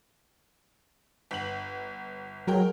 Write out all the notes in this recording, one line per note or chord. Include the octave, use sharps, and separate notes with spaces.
G1 F#7
F#3 G#3 A#4 G5